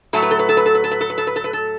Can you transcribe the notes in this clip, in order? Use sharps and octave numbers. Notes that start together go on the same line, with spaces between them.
A2 F#3 A3 A4
B4
A4
B4
A4
B4
A4
B4
A4
B4
A4
B4
A4
B4
A4
B4
A4